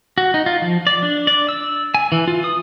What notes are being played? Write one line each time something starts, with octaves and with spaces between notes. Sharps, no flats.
F#4
D#4
F4
F3
D5
D4
D5
E6
G#5
E3
F4
D#6